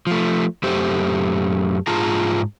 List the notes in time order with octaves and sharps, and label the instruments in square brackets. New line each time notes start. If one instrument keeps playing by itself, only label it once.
[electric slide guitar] F3 A3
F#2 A3 G4 C5
G#2 F4 G#4 A5 A#5